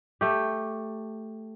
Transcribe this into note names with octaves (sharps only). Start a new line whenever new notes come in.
A3 G4